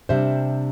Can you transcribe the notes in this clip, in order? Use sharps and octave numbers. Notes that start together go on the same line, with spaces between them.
C3 G3 D4 C5 E5